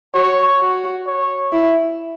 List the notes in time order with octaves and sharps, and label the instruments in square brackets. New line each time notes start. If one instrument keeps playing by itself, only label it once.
[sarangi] F#4 [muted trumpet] C#5
[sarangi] F#4
[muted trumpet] C#5
[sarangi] E4